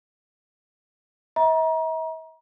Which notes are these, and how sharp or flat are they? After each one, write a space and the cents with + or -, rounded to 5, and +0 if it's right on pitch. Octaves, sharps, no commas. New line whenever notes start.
E5 -45 A#5 +30